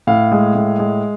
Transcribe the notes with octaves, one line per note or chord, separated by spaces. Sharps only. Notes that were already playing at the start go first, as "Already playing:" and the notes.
A2 F5
G#3
A2
G#3